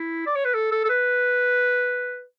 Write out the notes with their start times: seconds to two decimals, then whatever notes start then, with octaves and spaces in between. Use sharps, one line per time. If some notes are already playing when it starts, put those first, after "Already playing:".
Already playing: E4
0.26 D5
0.36 C#5
0.45 B4
0.54 A4
0.72 A4
0.84 A4
0.89 B4